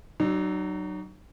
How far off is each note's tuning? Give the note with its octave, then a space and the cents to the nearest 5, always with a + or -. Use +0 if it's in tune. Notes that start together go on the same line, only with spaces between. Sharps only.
F#3 +25 D#4 -45